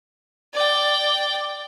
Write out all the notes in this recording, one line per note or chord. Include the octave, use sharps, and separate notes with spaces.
D5 G5